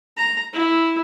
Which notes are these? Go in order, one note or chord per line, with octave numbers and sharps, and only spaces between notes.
A#5
E4